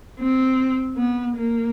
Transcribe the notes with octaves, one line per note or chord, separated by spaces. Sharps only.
C4
B3
A#3